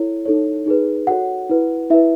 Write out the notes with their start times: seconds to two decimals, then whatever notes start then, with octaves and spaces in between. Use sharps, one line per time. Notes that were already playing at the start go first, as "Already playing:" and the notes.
Already playing: E4 A4 C#5
0.26 D#4 A4 C#5
0.66 D#4 G#4 B4
1.07 F#4 A4 C#5 F#5
1.49 E4 B4
1.90 E4 B4 E5